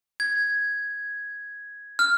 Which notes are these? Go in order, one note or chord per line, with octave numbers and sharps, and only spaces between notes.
G#6
F6